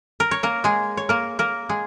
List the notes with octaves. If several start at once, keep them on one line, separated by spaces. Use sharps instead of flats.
A#4
C#5
A#3 A#4
G#3 G#4
C#5
A#3 A#4
A#3 A#4
G#3 G#4